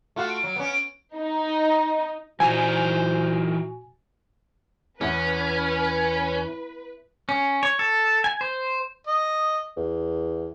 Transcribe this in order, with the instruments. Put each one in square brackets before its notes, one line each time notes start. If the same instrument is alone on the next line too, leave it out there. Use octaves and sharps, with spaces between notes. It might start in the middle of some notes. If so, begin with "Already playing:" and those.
[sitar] A3 F4 F#4
[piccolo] D7
[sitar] F#3
B3 C#4
[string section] D#4
[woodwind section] A#2 F#4 [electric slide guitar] E3 D#4 A#5 [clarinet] C5 [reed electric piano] G#5
[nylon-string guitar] E2 [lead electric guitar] C#4 [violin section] B4
[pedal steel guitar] C#4
C#5
A4
G#5
C5
[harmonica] D#5
[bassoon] E2